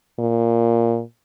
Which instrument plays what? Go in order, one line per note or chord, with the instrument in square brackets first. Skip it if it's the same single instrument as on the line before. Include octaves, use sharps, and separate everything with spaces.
[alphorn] A#2